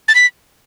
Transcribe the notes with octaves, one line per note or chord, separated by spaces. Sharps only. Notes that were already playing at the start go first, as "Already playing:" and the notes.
A6
B6